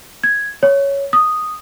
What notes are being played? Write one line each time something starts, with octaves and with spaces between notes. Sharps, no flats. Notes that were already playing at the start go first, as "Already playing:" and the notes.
G#6
C#5
D#6